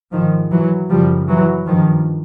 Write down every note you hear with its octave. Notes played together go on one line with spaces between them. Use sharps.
G#2 D#3 F3
E3 F#3
F#2 C#3 F3 G3
E3 F#3
G2 D#3 F3